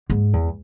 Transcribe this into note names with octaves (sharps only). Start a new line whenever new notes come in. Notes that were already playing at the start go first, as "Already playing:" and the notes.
G#2
E2